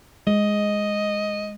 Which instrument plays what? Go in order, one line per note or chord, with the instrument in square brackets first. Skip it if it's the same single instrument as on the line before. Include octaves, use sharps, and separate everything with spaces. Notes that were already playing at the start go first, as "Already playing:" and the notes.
[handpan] G#3 [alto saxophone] D#5